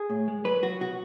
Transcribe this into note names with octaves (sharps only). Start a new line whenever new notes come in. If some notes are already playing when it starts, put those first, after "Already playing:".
Already playing: G#4
A2
G#3
F#3 B4
F#3 F#4
B2 F#4